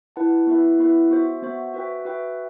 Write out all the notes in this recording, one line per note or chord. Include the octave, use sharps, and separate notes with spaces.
E4 B4 F#5 A5
B3 E4 B4 E5
B3 E4 B4 E5
B3 F#4 C5 E5
B3 F#4 C5 E5
F#4 B4 E5 G5
F#4 B4 E5 G5